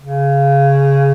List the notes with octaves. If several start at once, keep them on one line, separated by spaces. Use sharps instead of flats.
C#3